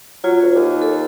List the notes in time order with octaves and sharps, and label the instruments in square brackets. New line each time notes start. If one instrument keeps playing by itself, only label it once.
[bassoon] F#3 [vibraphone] F4
[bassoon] D2
D#2
[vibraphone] A4